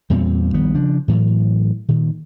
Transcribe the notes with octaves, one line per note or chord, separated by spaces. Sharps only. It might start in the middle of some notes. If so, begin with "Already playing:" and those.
E2 A#2 G3 C4
A#1 D#3 G3 B3
C#3 F3 D4
A2 E3 F#3
A#2 D#3